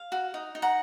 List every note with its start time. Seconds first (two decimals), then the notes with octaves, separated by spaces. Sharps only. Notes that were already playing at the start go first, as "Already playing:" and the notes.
Already playing: F5
0.12 F#4
0.34 D#4
0.55 D#4
0.62 F#5 A#5